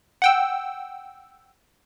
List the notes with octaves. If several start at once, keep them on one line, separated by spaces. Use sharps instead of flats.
F#5 G5 E6